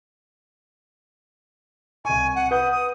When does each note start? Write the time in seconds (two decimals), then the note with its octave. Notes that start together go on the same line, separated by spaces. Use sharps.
2.05 C2 G#5 C#6
2.35 F#5
2.51 B4 F#5 D#6 G6
2.72 D#6